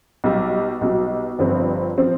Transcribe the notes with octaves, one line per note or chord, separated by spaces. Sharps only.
B1 B2 G3
B1 B2 G3
G1 G2 F3 C4
F3 C4